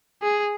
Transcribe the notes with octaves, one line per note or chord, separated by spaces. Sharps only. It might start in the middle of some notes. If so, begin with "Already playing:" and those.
G#4